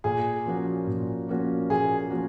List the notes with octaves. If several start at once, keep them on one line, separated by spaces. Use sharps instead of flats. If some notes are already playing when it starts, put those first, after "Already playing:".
A#2 G#4
F3 A#3 C#4 F#4
A#2
F3 A#3 C#4 F#4
A#2 G#4
F3 A#3 C#4 F#4